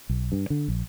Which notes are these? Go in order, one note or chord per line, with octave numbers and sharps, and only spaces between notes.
B1
G2
D3
A#1